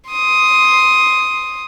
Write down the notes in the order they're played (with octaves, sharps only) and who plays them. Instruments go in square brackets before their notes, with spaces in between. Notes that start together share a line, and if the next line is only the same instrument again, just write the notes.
[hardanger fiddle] C6 D#6